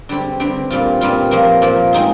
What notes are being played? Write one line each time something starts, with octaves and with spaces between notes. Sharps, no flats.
D3 G3 C4 G4
D3 G3 C4 G4
A#2 G3 C4 F4
A#2 G3 C4 F4
A#2 F3 A#3
A#2 F3 A#3
G#3 C4 D#4 G#4